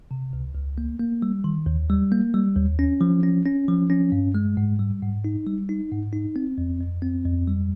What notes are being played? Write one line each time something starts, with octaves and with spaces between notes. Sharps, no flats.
C3
C#2
C#2
A#3
A#3
G3
D#3
D#2
G3
A#3
G3
D#2
C#4
F3
C#4
C#4
F3
C#4
G2
G#3
G#2
G3
G#2
D#4
G3
D#4
G#2
D#4
C4
F2
F2
C4
F2
G3